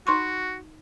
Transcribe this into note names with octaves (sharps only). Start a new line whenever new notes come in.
D#4 F#4 C6 C#6